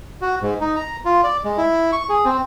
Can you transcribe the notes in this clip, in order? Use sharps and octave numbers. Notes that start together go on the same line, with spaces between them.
F#4
G#2
D#4
A#5
F4
D5
G#3
E4
C#6
G#4
C4